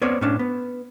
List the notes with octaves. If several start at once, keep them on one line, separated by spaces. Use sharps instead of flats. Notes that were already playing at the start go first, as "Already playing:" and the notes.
B3 C4 C#5 D5
A2 C#4 D4
B3